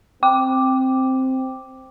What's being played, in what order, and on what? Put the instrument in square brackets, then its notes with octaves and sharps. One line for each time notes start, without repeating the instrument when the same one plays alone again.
[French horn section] C4 [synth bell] G5 D6